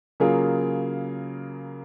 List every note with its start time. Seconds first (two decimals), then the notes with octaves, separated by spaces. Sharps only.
0.20 C#3 F#3 A#3 F4 G#4